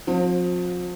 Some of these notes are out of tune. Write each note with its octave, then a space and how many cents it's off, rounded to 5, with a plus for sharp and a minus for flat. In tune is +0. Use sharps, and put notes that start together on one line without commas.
F3 +40 C4 +20